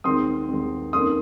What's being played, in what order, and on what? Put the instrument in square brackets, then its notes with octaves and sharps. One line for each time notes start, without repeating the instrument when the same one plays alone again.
[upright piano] D#2 D#3 G#3 C4 C6 D#6
D#2 D#3 G#3 C4
F2 D#3 A#3 C#4 C6 D#6